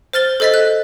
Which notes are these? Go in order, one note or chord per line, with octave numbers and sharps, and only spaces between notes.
C5 F6 A6 G7
A4 C5 D#5 A6 B6
F#6